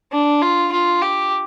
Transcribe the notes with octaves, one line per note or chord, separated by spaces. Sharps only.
D4
F4
F4
G4